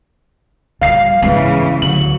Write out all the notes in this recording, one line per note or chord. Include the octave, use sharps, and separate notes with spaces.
F3 G3 F5 C7
E2 G#2 C#3 E3 G#3
D2 F#3 F#7